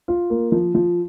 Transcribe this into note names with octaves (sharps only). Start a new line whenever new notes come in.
F4
A#3
F3
F3